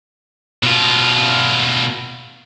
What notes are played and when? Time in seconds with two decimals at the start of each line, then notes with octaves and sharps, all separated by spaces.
0.63 B2 F4